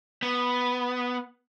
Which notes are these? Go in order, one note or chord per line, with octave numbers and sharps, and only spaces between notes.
B3